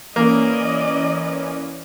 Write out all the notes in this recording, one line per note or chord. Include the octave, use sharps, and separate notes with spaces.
E3 A#3 C#4 D5 D#5